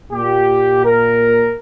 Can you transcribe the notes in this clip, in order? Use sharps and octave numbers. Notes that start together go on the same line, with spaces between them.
A#2 G4
A#4